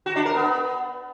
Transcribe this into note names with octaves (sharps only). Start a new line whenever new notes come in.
F#4
D4
A#4
B3